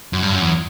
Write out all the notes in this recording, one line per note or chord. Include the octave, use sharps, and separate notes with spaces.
F#2
G2
F#2
E2